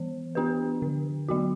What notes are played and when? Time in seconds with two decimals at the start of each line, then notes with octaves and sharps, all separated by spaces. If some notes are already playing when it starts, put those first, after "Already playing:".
Already playing: E3 B3
0.35 B3 D4 G4 B4
0.82 D3
1.29 F#3 B3 F#4